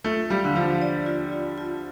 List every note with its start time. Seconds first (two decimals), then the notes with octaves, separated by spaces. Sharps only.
0.04 A3 F4
0.30 G3 F5
0.44 D3
0.56 F3 F5
0.82 D5
1.06 F4
1.32 F4
1.58 F4